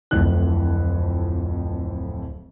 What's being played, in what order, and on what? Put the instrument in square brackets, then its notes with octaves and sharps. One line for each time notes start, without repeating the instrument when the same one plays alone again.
[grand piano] D1 F2 A2 F#6